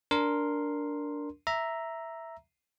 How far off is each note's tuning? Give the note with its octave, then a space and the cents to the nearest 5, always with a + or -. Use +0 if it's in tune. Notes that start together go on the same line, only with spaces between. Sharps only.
D4 -10 A#4 +0 C6 +0
E5 +0 A#5 +0